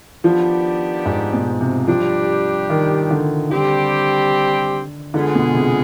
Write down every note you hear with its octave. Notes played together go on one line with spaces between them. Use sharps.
D#3 F3 B3 D4 G4
G#2
B2
C3
F3 G3 D4 G4
D#3
D3
D3 G3 C4 G4
D3 G#3 B3 F4 G#4
B2
C3